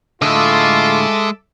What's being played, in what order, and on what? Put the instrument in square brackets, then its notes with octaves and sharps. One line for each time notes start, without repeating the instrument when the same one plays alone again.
[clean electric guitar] A2 D3 [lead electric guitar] G#3 D#5 [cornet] F4 [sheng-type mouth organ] A4 E5 D6